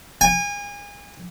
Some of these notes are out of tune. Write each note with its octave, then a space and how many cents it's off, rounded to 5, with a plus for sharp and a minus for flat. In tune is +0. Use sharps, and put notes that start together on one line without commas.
G#5 -30